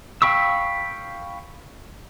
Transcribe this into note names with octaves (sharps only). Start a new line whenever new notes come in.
F5 G5 B5 C#6 E6